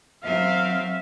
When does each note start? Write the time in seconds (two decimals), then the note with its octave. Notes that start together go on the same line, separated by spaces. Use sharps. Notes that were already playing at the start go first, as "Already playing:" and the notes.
0.24 F#3 C4 E5 F5